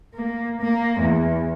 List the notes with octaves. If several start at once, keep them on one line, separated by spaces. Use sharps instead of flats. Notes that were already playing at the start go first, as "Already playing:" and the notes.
A#3
A#3
E2